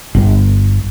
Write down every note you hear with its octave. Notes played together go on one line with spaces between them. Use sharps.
G1